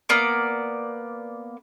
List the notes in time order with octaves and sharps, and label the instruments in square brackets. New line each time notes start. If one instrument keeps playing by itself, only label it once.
[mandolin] A#3 B3 D5